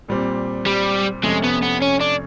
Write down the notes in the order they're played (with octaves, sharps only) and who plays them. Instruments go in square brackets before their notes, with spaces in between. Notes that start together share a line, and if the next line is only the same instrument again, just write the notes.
[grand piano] A#2 G3 C4
[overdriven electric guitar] G3
[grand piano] F2 C3 F3 A3 C#4 [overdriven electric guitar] G#3
[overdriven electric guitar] B3
B3
C#4
D4